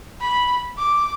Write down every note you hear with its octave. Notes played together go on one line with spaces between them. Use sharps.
B5
D6